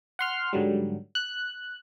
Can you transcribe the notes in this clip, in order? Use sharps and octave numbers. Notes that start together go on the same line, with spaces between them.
F#5 C6 F6
G#2 D3 F#3 G3
F#6